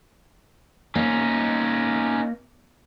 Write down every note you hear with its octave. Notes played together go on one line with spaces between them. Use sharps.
A#3 C#4 D#4